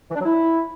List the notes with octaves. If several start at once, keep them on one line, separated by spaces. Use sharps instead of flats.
E3
D4
F#3
E4